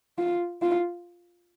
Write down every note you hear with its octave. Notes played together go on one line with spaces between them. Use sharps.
F4
F4